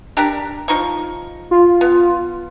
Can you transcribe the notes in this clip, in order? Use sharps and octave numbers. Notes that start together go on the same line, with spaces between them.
D4 G4 A#4
F3 D#4 C#6
F4
B3